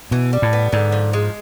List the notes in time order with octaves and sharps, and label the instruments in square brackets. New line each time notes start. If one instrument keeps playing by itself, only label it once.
[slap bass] B2 [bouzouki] E3
[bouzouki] G3
[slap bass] A2
[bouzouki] B3
[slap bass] G#2 [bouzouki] D3
[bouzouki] F3
G#3